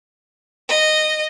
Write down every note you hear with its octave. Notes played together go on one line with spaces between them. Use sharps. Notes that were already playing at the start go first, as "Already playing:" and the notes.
D#5